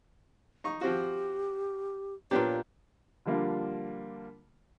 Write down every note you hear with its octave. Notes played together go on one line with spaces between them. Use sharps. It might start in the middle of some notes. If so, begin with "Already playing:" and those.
D#4 C#6
F3 C4 F#4 G4
A#2 A#3 B3 D4 G4 C#5
D3 F3 G3 A#3 D4 F4